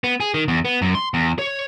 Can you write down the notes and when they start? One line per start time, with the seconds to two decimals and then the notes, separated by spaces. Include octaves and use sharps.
0.04 B3
0.20 G#4
0.34 D#3
0.48 E2
0.65 B3
0.82 F#2
0.95 C6
1.14 E2
1.39 C#5